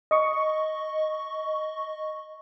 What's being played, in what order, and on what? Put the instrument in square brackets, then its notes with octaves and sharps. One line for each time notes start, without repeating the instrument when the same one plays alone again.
[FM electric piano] D#5 C#6